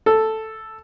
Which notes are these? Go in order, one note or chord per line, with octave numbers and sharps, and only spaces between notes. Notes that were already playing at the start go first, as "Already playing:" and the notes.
A4